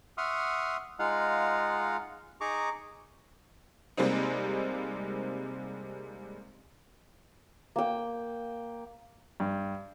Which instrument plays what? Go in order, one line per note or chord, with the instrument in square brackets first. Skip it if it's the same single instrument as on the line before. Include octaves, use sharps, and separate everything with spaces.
[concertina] E5 F#5 C6 C#6 D#6 F6
G#3 D#4 F4 F5 F#5
D#4 G#4 A#5 C#6 D6
[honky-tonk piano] C3 G3 G#3 A#3 C4 D#4
[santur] A#3 G5
[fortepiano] G2